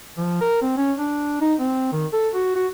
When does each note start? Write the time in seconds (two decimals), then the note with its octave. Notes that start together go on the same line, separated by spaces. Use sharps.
0.17 F3
0.41 A#4
0.62 C4
0.77 C#4
0.98 D4
1.41 D#4
1.59 C4
1.92 D#3
2.13 A4
2.34 F#4
2.56 F#4